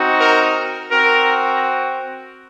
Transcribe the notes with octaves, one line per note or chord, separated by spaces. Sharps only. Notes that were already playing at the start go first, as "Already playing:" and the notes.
Already playing: C4 D#4 F#4
A#4
C4 F#4 A#4